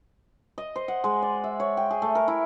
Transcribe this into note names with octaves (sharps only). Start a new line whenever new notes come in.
D#5
C5
F#5
G#3
D5
E5
C#5
G5
G#4
A3
A#4
E4